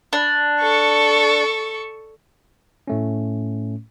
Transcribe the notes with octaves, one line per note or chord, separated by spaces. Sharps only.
D4
A4 C#6
A2 A3 C#4